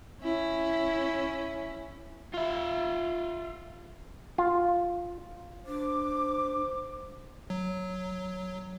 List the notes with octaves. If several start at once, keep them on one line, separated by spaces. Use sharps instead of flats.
C#4 E4
F4 E5
F4
D4 C5 D6
F#3